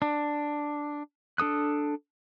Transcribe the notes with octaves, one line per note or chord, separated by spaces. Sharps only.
D4
D4 A4 D#6 F#6